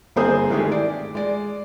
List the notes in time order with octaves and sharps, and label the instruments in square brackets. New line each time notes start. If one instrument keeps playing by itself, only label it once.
[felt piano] G1 A#3 C4 G#4 C5 D#6
D#3 E3 G#3 A3 G4 G#4
D5
G#3 D5